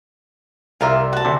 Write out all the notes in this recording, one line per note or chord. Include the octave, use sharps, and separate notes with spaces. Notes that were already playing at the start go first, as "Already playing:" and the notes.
C2 C3 F4 A#4 E5
F#4 A5
D2 C3